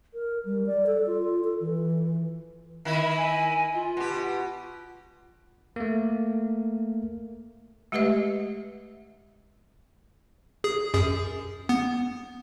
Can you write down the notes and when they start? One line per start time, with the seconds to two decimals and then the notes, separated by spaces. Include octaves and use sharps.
0.14 A#4
0.45 G3
0.66 D5
0.87 A4
1.07 F4
1.44 A4
1.60 E3
2.85 D#3 E4
3.17 G#5
3.74 F4
3.97 B2 G4
5.76 A3 A#3
7.92 G#3 A3 G4 B4 D#5 E5
10.64 G#4
10.94 F#2 G#4
11.69 B3